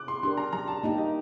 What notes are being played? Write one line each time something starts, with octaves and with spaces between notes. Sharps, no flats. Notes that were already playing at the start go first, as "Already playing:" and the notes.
Already playing: D6 F#6
C6
D4 G4 A#4 C6
A#5
F#3 A#5
A5
A#3 D#4 G4 D#5
D#5